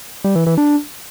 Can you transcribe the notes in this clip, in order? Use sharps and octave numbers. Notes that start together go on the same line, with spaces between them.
G3
E3
E3
D4